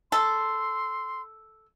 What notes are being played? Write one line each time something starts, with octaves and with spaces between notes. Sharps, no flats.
A4 C6